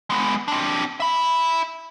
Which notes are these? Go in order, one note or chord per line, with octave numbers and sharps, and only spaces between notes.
G#3 B3
C4 D4
E5 B5